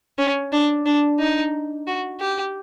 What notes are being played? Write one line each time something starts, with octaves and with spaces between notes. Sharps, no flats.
C#4
D4
D4
D#4
F#4
G4